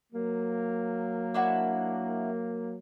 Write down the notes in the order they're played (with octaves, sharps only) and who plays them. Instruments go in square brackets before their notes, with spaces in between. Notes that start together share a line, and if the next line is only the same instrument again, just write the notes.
[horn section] F#3 A#3
[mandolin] D4 E4 F#4